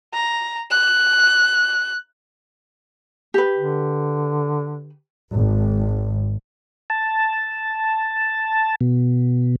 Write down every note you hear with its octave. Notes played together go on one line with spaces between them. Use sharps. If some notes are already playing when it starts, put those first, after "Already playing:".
A#5
F#6
G4 B4
D3
G#1
A5
B2